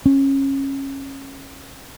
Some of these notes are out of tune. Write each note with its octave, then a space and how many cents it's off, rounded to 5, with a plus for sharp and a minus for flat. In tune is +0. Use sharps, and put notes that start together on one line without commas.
C#4 -20